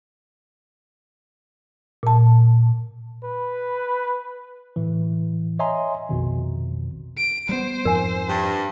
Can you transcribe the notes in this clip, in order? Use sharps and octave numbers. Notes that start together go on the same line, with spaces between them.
A#2 A5
B4
A2 E3
C#5 D#5 E5 G#5 A#5 C6
A#1 F2 B2 D#3
D7
G3 A3 B3 C5
F2 G#2 F3 A#4 G#5
G2